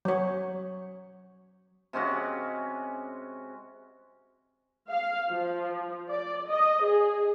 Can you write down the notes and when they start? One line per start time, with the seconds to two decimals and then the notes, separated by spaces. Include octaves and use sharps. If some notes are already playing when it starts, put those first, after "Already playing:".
0.05 F#3 C#5
1.93 C3 G#3 C#4 F#4
4.89 F5
5.30 F3
6.10 D5
6.48 D#5
6.84 G#4